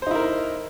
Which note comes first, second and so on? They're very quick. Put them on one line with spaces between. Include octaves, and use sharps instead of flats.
C5 D#4 E4 A#4